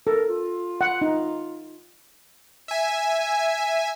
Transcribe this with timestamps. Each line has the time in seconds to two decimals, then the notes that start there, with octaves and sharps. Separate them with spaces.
0.07 A4 A#4
0.29 F4
0.81 F#5
1.02 D#4
2.68 E5 G#5